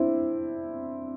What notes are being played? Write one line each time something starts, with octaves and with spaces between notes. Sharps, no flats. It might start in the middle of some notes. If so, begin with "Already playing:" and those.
Already playing: C4 D4 E4